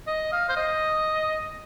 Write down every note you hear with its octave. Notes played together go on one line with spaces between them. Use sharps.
D#5
F5
C5
D#5